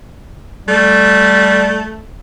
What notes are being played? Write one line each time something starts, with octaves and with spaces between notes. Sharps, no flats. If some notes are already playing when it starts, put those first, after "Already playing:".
G3 A3